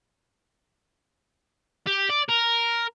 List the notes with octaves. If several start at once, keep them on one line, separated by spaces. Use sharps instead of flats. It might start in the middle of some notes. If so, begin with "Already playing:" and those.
G4
D5
A#4